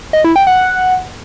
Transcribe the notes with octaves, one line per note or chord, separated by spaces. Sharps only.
D#5
E4
G5
F#5